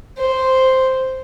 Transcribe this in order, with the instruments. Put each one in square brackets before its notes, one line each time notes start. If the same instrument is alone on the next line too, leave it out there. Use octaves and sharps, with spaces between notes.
[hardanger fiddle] C5